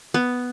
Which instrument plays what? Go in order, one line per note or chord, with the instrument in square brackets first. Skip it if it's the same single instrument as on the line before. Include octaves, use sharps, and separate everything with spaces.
[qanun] B3